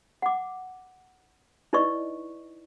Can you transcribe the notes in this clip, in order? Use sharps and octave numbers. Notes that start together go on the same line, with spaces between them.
F#5 D6
D#4 E4 B4 D5 D#5 C#6